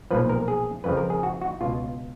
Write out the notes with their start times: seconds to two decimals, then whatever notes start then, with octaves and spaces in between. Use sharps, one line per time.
0.11 B1 A#2 F3 B4
0.29 A#4
0.48 G#4
0.84 F2 C#3 F3 B4
0.97 A#4
1.10 G#4
1.23 F#4
1.41 F#4
1.61 C#2 B2 F4